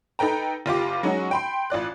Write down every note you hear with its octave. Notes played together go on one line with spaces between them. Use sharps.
D#4 A4 B4 G5 A#5
F#1 F4 G4 D6
F#3 G#3 C#4 D#4 F#4
G5 B5 C6
A1 F4 D5 F#6